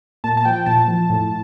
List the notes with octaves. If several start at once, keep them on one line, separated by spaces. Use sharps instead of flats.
A#2 A5
A5
F3 G5
A#2 A5
F3
A2